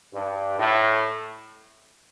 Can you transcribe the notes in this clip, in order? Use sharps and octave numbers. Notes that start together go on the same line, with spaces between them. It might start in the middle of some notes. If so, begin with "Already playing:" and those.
G2
A2